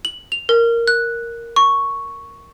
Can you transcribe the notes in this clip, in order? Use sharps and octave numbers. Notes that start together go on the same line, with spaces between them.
F#7
F7
A#4
F#6
C#6